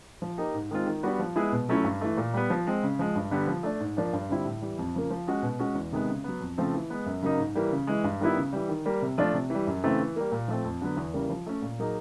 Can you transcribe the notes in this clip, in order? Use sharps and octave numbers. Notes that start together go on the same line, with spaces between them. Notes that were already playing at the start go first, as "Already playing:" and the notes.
F3
A#3 D#4 G4
G#2
D#3 G#3 C4 F4
D#3
G3 B3 D4 F#4
F3
G#3 B3 E4 G#4
B2
F#3 A3 C#4 E4
G2
E3 A3
A#2
G3 B3
F3
G#3 C4
C#3
F3 G#3
G2
D3 G3 B3
F3
A3 D4
G#2
F3 A#3 D4
G2
D3 G3 C4 E4
A2
E3 G3
F2
C#3 F3 A#3
F3
G#3 C#4 F#4
B2
G#3 C#4 F#4
E2
C3 D#3 G#3 B3
C#3
F#3 B3
F2
C#3 F3 A3 C4
E3
G#3 B3
F#2
C#3 F#3 A#3 D#4
G#2
E3 G3 A#3
C#3
E3 G#3
G2
D#3 G3 B3 E4
C#3
E3 G3
D#3
G3 A#3
C3
F3 A3 D4 F4
C3
E3 G3
F#2
C#3 E3 A3 C4
E3
G3 A#3
A#2
F3 A3 C4
F2
D3 F#3 B3
E2
C#3 E3 G3 A#3
F3
A3 C#4
A#2
F#3 A#3 D#4 G#4